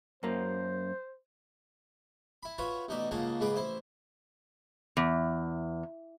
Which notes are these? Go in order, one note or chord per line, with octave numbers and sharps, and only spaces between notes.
F#2 A#3 C5
E4 B5
F4 F#4 B4 C#5 E5 F#5
A1 B2 D#4 F#4 D5 E5
C#2 C#3 A#3 G#4 F#5 A5
G#2 C#3 G#4 B4 F#5 D6
A1 E4 C5 E5
E2